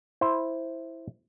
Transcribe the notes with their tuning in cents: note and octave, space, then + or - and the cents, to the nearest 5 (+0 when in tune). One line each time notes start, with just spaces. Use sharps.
E4 +0 C5 +5